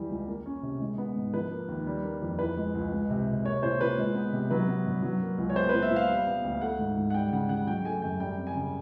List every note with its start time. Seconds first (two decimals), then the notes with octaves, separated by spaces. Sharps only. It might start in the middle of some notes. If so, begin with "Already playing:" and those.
Already playing: E2 E3 G3
0.10 C#2
0.27 A#3
0.46 C#4
0.63 C3
0.80 G#3
0.98 B3
1.16 G#2
1.34 F3 B4
1.51 A#3
1.68 D#2
1.87 G3
2.04 A#3
2.22 F2
2.39 E3 B4
2.57 G#3
2.75 C#2
2.92 G#3
3.10 C3
3.27 C3
3.44 A#3 C#5
3.63 A#2 C5
3.80 A#2 B4
3.98 G#3
4.15 B3
4.32 C3
4.51 F#3 B4
4.68 B3
4.86 G2
5.03 F#3
5.22 A#3
5.38 C#2
5.50 C#5
5.56 B3 C5
5.69 A#2 B4
5.82 E5
5.91 A#2
5.96 F5
6.10 G3
6.27 B3
6.44 D2
6.61 A3 F#5
6.79 G#2
6.97 G#2
7.10 F#5
7.14 G3 G5
7.32 C#3 F#5
7.49 C#3 F#5
7.67 F#3 G5
7.85 A3 G#5
8.02 F#2 G5
8.20 G3 G5
8.38 C4
8.47 G#5
8.55 C#3